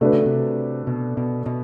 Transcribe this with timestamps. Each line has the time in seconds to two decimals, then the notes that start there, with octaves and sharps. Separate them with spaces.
0.01 C3 A3 D4 F#4 B4
0.13 C#3
0.26 C3
0.87 B2
1.17 B2
1.46 B2